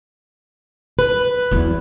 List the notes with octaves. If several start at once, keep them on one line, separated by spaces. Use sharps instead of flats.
B4
E2 F#3